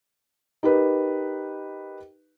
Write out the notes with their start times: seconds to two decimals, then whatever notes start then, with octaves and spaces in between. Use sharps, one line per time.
0.63 D#4 G4 A#4 B4